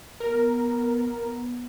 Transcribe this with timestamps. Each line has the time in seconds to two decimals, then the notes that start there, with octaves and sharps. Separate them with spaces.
0.20 B3 A#4